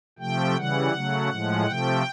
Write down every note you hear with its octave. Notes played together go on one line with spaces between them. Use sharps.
C3 F3 A3 G5
C#3 E3 G3 F#5
C#3 F#3 A3
A2 F3 G#3
C3 F3 A3 G5